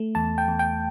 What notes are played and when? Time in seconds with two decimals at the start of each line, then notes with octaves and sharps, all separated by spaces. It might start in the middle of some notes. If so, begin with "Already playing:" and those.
Already playing: A3
0.15 E2 A5
0.38 G5
0.48 E2
0.59 G5